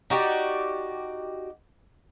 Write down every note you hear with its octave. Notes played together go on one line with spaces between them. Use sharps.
D#4 F#4 G4 D5